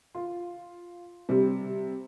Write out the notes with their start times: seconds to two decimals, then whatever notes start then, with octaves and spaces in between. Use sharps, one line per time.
0.15 F4
1.29 C3 G3